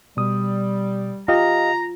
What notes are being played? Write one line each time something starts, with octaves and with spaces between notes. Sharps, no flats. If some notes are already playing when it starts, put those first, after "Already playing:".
B2 G3 D#6
F4 G4 D#5 F5 A#5